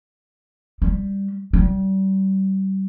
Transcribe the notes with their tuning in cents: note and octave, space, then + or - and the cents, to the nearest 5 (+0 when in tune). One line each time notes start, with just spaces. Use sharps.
G3 +10
G3 -35